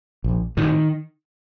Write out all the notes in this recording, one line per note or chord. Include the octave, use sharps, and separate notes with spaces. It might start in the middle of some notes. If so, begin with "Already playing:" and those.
A#1
A2 D#3